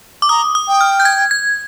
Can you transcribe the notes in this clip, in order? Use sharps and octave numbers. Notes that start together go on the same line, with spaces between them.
D6
A#5 D#6
D#6
G5
F6
G6
G#6
G#6